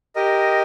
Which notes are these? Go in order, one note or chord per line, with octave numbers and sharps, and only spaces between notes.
G4 A#4 D#5